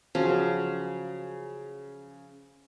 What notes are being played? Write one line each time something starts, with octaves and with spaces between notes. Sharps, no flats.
C#3 F3 F#3 C#4